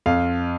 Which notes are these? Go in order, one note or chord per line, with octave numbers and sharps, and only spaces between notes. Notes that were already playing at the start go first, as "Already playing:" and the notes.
F2 F5